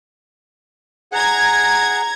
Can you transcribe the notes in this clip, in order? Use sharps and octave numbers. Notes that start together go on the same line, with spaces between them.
G#4 F#5 A#5 G#6